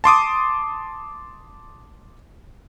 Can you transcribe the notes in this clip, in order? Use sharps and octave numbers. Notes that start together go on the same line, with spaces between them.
A5 C6 D6 D#6